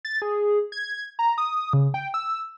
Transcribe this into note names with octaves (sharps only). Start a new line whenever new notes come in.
A6
G#4
G#6
A#5
D#6
C#3
G5
E6